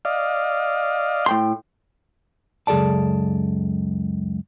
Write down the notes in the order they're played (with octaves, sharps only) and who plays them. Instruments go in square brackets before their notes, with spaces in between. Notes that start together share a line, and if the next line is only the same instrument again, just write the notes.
[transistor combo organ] D5 D#5 F5
[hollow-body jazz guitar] A2 G5 C6
[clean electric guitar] C#2 F#2 G#4 A4 D5 A5